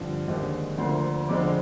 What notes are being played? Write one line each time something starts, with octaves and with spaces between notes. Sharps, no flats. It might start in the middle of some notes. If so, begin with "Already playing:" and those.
Already playing: G2 D3 F3 C4
D#2 D3 G#3 C4
D2 D3 F3 A#3 C6
F2 D3 G#3 C4 D6